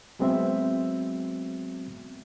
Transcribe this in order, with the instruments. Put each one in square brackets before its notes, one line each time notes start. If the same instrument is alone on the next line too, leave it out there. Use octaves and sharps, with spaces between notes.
[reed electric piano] F#3 G#3 B3 C4 F#4 E5